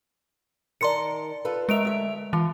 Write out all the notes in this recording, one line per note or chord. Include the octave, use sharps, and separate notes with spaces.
D#3 A#4 D5 A5 C6 C#7
F4 A4 B4
G#3 A#4 D#5 E5 D7 F7
D2 D3 E5
E3 F4